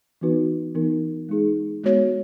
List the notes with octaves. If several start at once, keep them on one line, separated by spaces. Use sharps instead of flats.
E3 B3 D#4 F#4 B4
E3 B3 D#4 A#4
G#3 D#4 G#4
G#3 B3 F#4 C#5